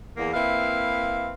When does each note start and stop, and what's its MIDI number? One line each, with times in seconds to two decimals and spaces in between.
0.17 0.32 40
0.17 0.32 58
0.34 1.31 58
0.34 1.31 60
0.34 1.31 64
0.34 1.31 71
0.34 1.31 76
0.34 1.31 77